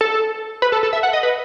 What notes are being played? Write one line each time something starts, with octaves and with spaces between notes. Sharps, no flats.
A4
B4
A4
A4
E5
F#5
D#5
B4